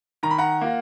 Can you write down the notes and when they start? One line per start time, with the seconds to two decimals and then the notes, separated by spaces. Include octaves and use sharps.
0.23 D#3 A#5
0.31 B5
0.38 F#5 A#5
0.61 A#3 F4